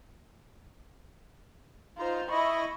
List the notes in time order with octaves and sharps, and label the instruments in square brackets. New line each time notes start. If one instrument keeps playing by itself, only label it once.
[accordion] D#4 A#5 [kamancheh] F4 C5
[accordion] E4 D#5 [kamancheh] B5 C#6